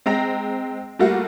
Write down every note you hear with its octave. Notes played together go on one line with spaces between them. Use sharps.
G#3 C4 A#5 A#6
G3 A3 A#3 F4 F#4